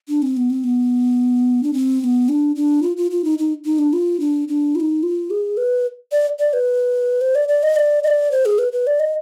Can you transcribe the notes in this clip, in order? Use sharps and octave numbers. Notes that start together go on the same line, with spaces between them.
D4
C4
B3
C4
B3
D4
C4
C4
B3
D4
D4
F4
F4
F4
D#4
D#4
D#4
D4
F4
D4
D4
F4
D#4
F4
G#4
B4
D5
D5
B4
C5
D5
D5
D#5
D5
D#5
D5
C5
G#4
B4
B4
D5
D#5